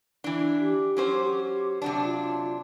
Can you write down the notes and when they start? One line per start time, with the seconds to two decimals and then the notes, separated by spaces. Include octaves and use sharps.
0.24 E3 D4
0.61 G4
0.97 F#3 C#4 C5
1.82 C3 F#3 D4
2.04 F4